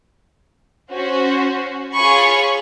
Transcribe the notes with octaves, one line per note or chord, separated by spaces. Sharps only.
C#4 F#4 C5
F4 G#4 C#5 G#5 B5 C#6